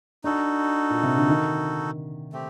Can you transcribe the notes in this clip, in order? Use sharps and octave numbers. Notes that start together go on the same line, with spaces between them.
D4 D#4 F#4 A4
A#2
C3
D3
D#3
A3 C4 G4